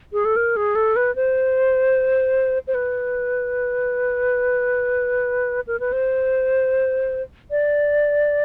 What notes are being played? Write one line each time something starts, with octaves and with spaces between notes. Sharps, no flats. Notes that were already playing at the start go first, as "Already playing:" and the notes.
G#4
A4
A#4
G#4
A4
B4
C5
C5
B4
A#4
B4
C5
D5